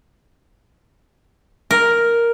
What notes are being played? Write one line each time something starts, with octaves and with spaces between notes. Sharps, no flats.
A#4